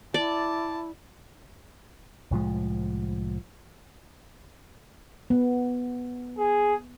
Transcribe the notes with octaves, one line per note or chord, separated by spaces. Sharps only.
E4 D5 A5
C2 A2 F3 G#3
B3
G#4